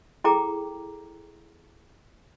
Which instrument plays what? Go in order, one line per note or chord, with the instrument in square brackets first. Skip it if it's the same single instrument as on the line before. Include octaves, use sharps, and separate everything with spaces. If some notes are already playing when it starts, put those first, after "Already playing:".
[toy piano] E4 G#4 A4 G5 A#5 D6